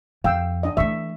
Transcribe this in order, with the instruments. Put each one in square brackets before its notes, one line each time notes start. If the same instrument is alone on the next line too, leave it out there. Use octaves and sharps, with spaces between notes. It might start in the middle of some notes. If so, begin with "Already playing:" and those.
[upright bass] F2 [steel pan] F5 G5 E6
[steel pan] D4 D#5
[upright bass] E3 A3 [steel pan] E5 C#6